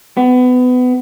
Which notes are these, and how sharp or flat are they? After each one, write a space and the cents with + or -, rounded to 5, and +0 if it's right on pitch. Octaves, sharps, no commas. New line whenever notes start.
B3 +25